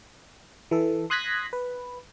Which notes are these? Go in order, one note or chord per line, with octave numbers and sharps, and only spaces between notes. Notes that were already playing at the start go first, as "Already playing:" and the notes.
E3 A4
C6 D#6 F#6 G#6 A#6 B6
B4